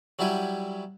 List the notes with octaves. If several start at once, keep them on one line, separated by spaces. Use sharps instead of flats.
F#3 G3 E4 G4 G#5